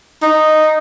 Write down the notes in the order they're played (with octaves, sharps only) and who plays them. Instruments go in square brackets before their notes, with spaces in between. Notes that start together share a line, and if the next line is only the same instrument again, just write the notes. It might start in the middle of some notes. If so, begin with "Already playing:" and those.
[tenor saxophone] D#4